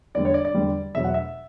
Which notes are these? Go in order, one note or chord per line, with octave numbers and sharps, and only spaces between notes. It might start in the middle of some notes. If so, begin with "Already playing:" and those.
E2 D3 G3 D5
C#5
D5
D5
E2 D3 G3
E2 B2 F#3 E5
F#5
E5